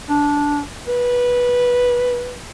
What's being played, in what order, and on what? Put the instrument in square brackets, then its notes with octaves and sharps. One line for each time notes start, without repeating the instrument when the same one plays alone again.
[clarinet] D4
B4